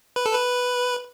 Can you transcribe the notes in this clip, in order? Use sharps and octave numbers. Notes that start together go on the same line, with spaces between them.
B4
A4
B4